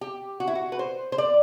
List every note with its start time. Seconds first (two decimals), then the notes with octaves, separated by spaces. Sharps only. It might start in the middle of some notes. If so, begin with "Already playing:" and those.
0.01 G4
0.40 F#4
0.47 E4
0.55 F#4
0.72 B4
0.79 C5
1.12 C5
1.18 D5